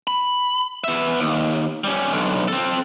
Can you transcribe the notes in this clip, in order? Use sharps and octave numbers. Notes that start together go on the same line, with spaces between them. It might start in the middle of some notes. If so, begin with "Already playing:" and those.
B5
B3 E5
D#2
G3 C#4
B1 D3
C4 A4